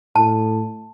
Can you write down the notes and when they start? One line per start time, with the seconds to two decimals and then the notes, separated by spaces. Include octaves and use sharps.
0.16 A2 A5